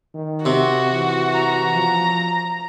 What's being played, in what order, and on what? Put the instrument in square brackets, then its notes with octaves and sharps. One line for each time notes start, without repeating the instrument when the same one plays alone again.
[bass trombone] D#3
[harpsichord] C3 [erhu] F#4
[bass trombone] E3
[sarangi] A#5
[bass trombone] F3